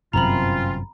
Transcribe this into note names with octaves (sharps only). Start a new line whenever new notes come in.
G1 F#2 C3 C4 C#4 F4 A#5 B5